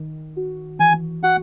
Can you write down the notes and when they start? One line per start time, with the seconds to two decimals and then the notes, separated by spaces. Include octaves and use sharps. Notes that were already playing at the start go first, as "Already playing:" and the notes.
Already playing: D#3
0.37 F#4
0.79 E3 G#5
1.23 F#4 F#5